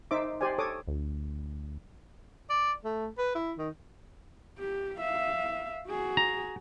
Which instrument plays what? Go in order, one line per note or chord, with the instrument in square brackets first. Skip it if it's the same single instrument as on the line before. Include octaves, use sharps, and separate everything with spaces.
[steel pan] D#4 C5 E5 D6
G4 C5 D5 G#5
A4 C#5 D6 D#6
[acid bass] D2
[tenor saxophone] D5
A3
B4
E4
D#3
[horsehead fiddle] G4
E5 F5
F#4 G#4
[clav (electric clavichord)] A#5